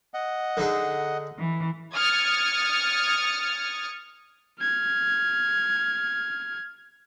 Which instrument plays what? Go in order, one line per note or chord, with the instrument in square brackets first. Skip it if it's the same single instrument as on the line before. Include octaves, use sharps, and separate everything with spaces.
[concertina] D#5 F#5
[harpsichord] D3 D#4 G#4
[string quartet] E3
[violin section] D#6 F6 G#6 A6 C#7
[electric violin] F6 G#6